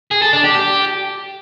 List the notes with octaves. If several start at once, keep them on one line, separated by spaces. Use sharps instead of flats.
G#4
A4
D4
G4
G4